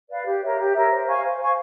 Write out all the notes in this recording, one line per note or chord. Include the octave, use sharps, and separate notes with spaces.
B4 D5 F5
G4
A#4 C#5 E5
G4
A#4 C#5 E5
C5
F5 G#5 C#6
C5
F5 G#5 C#6